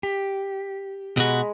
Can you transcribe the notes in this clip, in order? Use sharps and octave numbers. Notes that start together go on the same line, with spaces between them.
G4
B2 G#3 F#4 A#5 B5